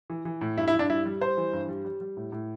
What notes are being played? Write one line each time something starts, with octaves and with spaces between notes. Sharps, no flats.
E3
E3
A2
G2 E4
E4
G2
D4
G3 E4
G3
G3 C5
E3
G2
G3
G3
G3
A2
A2